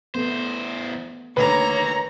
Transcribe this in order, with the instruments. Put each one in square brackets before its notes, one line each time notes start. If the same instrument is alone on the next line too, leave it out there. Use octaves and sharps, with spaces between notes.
[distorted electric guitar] E2 C5 [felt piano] A3 B3
[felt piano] D2 [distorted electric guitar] D#3 A#3 [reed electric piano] B4 [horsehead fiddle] C#5 A#5